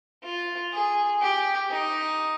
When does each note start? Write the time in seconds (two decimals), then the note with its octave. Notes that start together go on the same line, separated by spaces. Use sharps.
0.23 F4
0.72 G#4
1.22 G4
1.71 D#4